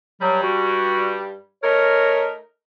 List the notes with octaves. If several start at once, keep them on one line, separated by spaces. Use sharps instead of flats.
G2 F#3 G3
F#4
A3 D#4 A#4 C#5